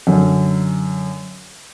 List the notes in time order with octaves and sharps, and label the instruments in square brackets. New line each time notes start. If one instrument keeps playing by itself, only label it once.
[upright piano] F#2 D3